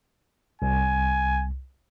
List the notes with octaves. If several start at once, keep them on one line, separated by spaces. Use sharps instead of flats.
C2 G#5